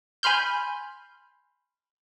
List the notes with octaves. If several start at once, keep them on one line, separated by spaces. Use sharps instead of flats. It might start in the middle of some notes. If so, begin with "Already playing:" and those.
G#5 B5 C6 F6 G6